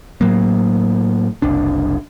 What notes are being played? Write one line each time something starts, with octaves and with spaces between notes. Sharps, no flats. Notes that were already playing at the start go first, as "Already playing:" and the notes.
A2 F#3 A#3
F#1 C2 D4